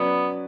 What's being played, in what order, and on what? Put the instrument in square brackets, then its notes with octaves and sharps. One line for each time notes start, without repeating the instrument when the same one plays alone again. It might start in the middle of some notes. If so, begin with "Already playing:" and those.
Already playing: [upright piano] F#3 C#4 F#4 B4 D5 [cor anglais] B3